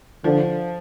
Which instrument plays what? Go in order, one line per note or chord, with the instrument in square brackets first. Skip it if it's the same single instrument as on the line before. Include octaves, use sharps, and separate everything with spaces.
[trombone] D3 [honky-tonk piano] F3